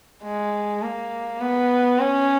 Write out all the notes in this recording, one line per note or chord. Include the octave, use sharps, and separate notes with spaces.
G#3
A#3
B3
C#4